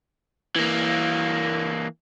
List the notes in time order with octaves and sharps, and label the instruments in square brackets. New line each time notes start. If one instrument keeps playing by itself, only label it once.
[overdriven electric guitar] E3 A#3